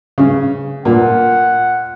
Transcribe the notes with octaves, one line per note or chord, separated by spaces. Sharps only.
C#3
A#2 F#5